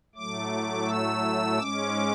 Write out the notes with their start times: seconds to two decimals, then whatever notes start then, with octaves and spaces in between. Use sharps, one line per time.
0.15 A2 F#3 A3 D6
0.88 E6
1.58 G#2 G#3 C#4 D6